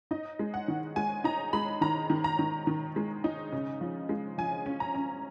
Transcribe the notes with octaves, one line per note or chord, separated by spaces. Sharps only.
D#4 D#5
G#3
F#5
D#3
G#3 G#5
D#4 A#5
G#3 B5
D#3 A#5
D#3
A#5
D#3
D#3
G#3
D#4
C#3
F3
G#3
F3 G#5
C#4
A#5
C#4